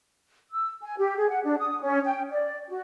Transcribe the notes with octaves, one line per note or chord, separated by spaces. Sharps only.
E6
G#5
G4
G#4
F#5
D4
D#6
C#4
G5
D5
F#4